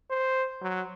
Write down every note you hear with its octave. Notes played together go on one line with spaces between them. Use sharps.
C5
F#3